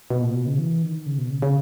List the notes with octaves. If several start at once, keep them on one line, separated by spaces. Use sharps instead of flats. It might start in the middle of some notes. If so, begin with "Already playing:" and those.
B2
A#2
B2
C#3
E3
D#3
C#3
B2
C#3
C#3